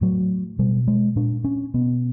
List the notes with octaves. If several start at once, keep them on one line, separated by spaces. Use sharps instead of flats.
A2 F#3
B2 G3
G#3
A#2 D4
C#4
B2 B3